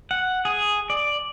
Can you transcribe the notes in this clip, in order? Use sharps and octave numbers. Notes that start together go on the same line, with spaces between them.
F#5
G#4
D5